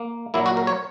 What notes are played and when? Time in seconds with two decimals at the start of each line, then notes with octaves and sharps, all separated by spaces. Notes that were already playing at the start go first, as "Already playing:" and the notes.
Already playing: A#3
0.34 A#2 F#3 A#3 E4
0.46 F#4
0.57 A#4
0.67 C#5